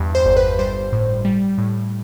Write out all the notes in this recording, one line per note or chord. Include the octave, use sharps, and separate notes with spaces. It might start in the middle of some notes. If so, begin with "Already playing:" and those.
Already playing: E2 G2
C5
G1
B4
G3 C5
A2
G3
A2